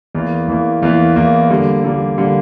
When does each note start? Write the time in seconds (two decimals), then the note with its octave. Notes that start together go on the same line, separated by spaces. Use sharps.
0.15 E2 E3 A#3
0.48 E2 E3 A#3
0.82 E2 E3 A#3
1.16 E2 E3 A#3
1.50 D3 G3 A#3
1.84 D3 G3 A#3
2.18 D3 G3 A#3